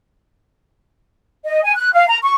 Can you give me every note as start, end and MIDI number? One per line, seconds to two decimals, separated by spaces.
1.45 1.59 75
1.64 1.72 80
1.75 1.88 90
1.93 2.05 77
2.08 2.17 82
2.22 2.35 85